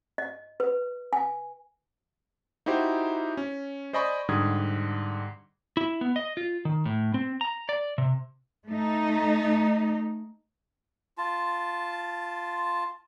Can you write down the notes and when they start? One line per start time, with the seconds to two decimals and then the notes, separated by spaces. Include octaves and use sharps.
0.18 D#5
0.60 B4
1.13 G#5
2.66 D#4 E4 F#4 G4 C5
3.37 C#4
3.93 C5 D5 D#5 G#5 B5 C#6
4.29 G#2 D3 G3 D#6 G#6
5.77 E4
6.01 B3
6.16 D#5
6.37 F4
6.65 D#3
6.85 A2
7.14 C4
7.41 A#5
7.69 D5
7.98 C3
8.69 A3 D#4
11.18 F4 A5